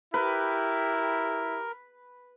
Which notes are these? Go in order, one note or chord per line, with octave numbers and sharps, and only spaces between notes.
E4 G4 A#4 B4